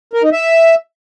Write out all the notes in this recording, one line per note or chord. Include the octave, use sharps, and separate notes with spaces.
A#4
D#4
E5